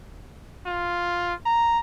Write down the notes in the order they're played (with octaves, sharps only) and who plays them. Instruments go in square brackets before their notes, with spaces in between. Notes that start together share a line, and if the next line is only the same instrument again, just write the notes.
[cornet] F4
A#5